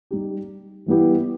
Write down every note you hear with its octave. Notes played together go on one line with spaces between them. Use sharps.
G3 D#4 G4
E3 G3 B3 E4 G4